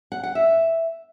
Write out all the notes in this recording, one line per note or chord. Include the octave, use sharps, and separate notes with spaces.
F#5
F#5
E5